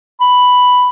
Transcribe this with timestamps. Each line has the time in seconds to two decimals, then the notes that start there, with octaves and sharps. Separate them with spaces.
0.21 B5